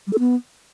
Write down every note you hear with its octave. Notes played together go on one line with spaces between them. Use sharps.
G3
A4
B3